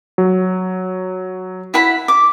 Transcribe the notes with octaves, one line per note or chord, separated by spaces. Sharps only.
F#3
E4 F#5 B5
D6